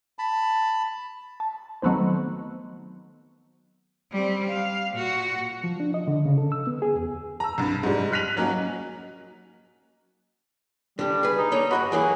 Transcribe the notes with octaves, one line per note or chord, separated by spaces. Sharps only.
A5 B5
A5
D#3 F#3 A3 B3 C4 C5
G3 C4
F5
A#2 F#4
F3
D4
D#5
D3
C#3
A4
E6
B3
G#4
E2
A#5 E6
C2 G2
G#2 G3
F6 F#6 B6 D#7 F7 F#7
F#3 A#3 C#4 D#4 F#4
D3 G3 G4
G#4 B4
D#4
D3 A#3 C#5
G2 F#4 D#5 B5
E3 F#3 A#3 G#4